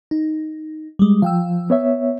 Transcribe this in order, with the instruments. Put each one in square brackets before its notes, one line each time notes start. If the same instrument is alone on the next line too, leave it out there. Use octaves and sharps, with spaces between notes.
[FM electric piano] D#4
G3 G#3
[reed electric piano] F3 [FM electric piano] F5 G5 E6
[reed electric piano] B3 C#5 E5